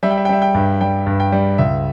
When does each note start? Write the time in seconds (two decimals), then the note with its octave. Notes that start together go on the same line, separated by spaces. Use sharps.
0.03 G3 E5
0.10 G5
0.17 E5
0.25 G5
0.29 G3 E5
0.42 G5
0.55 G2
0.81 G3 G5
1.07 G2
1.20 G5
1.32 G3
1.58 C#2 E5